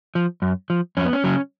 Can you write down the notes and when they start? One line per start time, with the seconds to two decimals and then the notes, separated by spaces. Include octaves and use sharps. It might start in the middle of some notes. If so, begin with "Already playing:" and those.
0.15 F3
0.42 F#2
0.70 F3
0.97 F2 C#4
1.05 B3
1.13 C#4
1.24 C#3 F#3